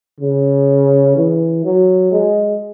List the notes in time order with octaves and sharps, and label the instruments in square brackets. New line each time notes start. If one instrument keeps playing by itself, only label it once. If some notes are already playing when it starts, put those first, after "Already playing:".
[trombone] C#3
E3
F#3
G#3